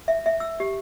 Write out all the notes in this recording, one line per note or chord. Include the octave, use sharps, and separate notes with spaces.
E5
E5
E6
G4